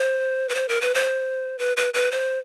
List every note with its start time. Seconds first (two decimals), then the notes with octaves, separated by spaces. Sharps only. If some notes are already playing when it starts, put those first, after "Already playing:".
Already playing: C5
0.49 B4
0.55 C5
0.69 A#4
0.81 B4
0.94 C5
1.59 B4
1.77 B4
1.94 B4
2.11 C5